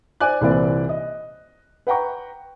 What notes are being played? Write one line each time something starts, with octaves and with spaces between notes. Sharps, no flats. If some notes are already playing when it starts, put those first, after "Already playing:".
C5 D5 G#5 D6 F#6
C2 A#2 E3 C4 D5
D#5
B4 F#5 G5 A#5 C#6